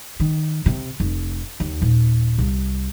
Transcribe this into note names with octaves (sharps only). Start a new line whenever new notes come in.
D#3
C3
F1
D#2
D#1
C2